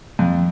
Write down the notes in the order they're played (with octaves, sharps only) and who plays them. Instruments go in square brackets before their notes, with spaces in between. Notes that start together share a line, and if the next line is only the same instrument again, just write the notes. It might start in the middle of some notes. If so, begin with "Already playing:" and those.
[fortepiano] F2